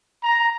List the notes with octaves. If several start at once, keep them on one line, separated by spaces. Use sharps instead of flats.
A#5